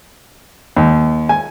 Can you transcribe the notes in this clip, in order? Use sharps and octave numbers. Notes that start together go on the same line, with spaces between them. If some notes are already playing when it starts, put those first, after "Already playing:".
D#2
G#5